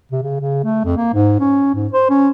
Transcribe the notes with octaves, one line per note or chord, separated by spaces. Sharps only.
C3
C#3
C#3
A3
F2
A#3
G#2
C#4
G#2
C5
C#4